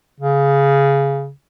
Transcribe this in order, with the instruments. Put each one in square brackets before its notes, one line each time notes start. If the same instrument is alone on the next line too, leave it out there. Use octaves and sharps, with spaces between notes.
[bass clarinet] C#3